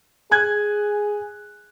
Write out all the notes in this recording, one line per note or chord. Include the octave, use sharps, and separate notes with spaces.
G#4 G#5 F#6 G#6